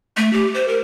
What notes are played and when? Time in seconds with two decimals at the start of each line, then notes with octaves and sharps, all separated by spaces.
0.17 A3
0.33 G4
0.54 C5
0.68 A#4